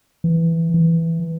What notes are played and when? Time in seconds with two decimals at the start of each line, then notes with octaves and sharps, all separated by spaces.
0.24 E3
0.74 E3